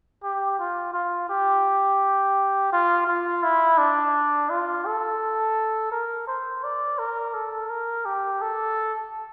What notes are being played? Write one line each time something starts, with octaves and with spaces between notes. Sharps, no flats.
G4
F4
F4
G4
F4
F4
E4
D4
F4
A4
A#4
C5
D5
A#4
A4
A#4
G4
A4